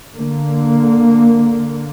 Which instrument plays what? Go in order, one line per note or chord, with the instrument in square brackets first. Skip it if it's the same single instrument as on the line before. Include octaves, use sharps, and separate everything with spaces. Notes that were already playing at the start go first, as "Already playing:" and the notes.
[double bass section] D3 A#3